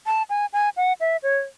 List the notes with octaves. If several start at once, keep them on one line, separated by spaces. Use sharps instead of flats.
A5
G#5
G#5
F#5
E5
C#5